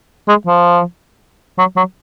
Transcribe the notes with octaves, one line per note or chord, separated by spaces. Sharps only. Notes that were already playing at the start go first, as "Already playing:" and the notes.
G#3
F3
F#3
F#3